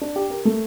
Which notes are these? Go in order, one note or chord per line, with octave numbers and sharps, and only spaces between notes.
D4
G4
A#4
A3